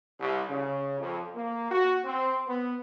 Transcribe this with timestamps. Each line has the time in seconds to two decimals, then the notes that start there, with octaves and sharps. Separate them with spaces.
0.20 C2
0.49 C#3
1.00 F2
1.36 A#3
1.72 F#4
2.05 C4
2.47 B3